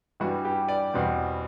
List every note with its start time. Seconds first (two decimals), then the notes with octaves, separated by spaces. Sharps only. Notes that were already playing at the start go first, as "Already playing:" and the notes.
0.20 G2 E3 G3 F#4
0.45 G4
0.68 D5
0.94 E2 B2 G3 C4